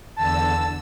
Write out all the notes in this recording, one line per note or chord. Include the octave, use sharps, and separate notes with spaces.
E2 D3 A5 E6